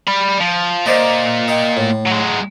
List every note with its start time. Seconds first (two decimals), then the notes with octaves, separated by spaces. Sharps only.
0.07 D5 B5
0.40 F3
0.86 A#2 C5 D5 D#5
1.48 D#5 F5 G5
1.77 A2
2.06 F#3 G#3